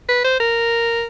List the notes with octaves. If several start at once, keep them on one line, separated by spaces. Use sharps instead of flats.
B4
C5
A#4